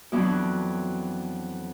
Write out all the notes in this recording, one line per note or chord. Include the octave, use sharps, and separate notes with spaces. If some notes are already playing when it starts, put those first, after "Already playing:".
F2 E3 F#3 B3 D4